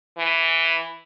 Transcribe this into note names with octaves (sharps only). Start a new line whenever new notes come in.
E3